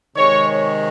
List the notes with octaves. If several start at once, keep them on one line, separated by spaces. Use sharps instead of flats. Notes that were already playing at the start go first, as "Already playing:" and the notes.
C3 D#3 G#3 C#5